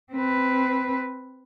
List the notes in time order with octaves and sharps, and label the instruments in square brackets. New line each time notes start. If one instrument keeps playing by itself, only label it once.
[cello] C4 B4